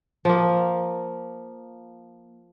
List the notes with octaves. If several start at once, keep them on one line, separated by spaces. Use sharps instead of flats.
F3 A#3